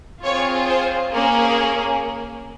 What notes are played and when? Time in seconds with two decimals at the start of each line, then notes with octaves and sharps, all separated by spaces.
0.24 C4 F4 G#4 C#5
0.68 C5
1.11 A#3 C#4 G#4